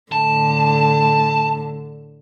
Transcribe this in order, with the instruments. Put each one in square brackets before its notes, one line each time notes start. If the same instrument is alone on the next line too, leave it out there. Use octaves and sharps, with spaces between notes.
[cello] A2 D3 [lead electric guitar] A5